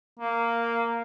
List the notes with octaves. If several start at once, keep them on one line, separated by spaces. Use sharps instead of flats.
A#3